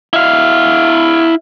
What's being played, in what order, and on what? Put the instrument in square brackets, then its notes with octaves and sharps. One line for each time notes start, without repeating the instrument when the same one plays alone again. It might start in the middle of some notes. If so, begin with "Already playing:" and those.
[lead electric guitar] E4 F5